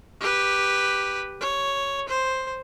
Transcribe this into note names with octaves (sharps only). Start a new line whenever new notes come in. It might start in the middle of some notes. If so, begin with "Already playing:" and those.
G4 B4
C#5
C5